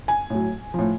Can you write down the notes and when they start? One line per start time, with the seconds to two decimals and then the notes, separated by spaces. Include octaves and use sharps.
0.08 G#5
0.30 A2 F#3
0.74 A2 F3